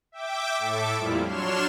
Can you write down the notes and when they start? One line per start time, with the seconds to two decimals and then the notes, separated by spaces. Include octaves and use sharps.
0.12 E5 G5 D6
0.59 A2 A4 E5 D6
0.97 F2 A#2 F3 G3 E4 F4
1.26 F#3 D4 C#5 C6 F6 E7